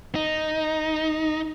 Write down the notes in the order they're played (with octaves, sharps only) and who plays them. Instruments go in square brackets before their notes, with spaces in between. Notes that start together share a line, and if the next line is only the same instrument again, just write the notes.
[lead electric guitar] D#4